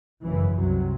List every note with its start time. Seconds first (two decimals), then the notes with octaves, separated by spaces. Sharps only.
0.24 G#1 F#2 C#3 E3
0.56 C2 C3 F#3